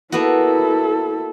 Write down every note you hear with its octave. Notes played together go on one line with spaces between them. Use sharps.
A#3 B3 E4 F#4 A4